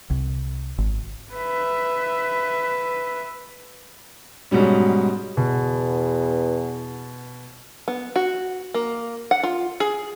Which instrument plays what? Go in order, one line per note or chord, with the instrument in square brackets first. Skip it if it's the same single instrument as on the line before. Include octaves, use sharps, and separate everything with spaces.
[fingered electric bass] C2
G#1
[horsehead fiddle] B4 E5
[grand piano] G#2 B2 F#3 G3 C#4
[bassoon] E2 [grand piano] B2
[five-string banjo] B3
F#4
A#3
F#5
F4
G#4